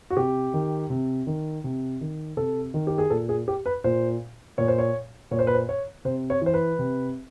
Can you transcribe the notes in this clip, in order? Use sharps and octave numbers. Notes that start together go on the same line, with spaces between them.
F#4
C3 G4
D#3
C3
D#3
C3
D#3
C3 A4
D#3
G4
G#4
A#2 A4
G#4
G4
B4
A#2 C5
A#2 C#5
C5
C#5
A#2 C#5
C5
B4
C5
C#5
C3 C5
C#5
E3 C5
B4
C3